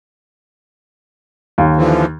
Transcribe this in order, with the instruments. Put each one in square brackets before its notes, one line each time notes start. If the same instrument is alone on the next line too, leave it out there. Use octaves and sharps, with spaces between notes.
[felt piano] D#2
[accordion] D3 E3 F3